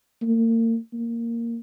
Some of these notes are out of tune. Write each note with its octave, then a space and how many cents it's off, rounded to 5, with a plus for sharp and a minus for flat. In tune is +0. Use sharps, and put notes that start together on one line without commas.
A#3 -40
A#3 -5